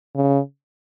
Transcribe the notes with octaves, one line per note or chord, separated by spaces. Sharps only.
C#3